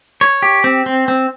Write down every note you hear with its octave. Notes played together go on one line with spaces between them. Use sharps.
C#5
G4
C4
C4
C4